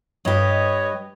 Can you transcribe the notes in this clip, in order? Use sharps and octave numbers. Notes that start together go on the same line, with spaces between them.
G2 G4 B4 C#5 D#5